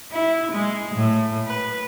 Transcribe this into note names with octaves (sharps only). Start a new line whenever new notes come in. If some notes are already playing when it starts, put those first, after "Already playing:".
E4
G#3
A2
B4